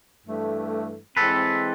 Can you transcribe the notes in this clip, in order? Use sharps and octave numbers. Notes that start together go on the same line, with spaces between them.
G2 E3 A3
E3 G#3 C4 A4 B4